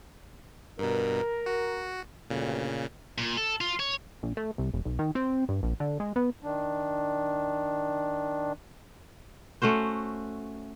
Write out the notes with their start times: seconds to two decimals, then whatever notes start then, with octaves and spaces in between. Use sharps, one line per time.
0.79 G2 B2 A#4
1.46 F#4
2.30 G1 D2 G2 A#2 C#3
3.18 A#2
3.37 A4
3.61 F4
3.80 C#5
4.23 A#1
4.37 A3
4.58 C2
4.74 F1
4.85 B1
4.99 D#3
5.15 C4
5.49 G2
5.63 A#1
5.80 D3
6.00 G#3
6.16 B3
6.43 D#3 D4
9.62 A3 C#4 F#4 C5